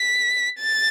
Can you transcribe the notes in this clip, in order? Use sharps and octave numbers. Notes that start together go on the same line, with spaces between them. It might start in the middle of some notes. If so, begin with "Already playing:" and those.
Already playing: B6
A6